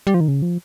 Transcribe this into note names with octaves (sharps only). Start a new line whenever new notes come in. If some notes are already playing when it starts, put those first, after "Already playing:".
G3
F3
D#3
C#3
F3